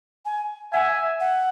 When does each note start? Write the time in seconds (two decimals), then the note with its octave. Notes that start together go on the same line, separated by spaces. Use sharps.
0.25 G#5
0.73 E5 F#5 G#5
1.20 F#5